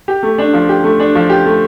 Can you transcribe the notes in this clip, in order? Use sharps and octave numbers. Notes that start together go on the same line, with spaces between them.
G4
A3
D4
F3
G4
A3
D4
F3
G4
A3